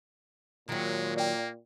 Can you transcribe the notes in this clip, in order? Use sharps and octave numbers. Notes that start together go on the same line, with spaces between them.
A#2 D#3 F#3 G#3
A#3 D5 G5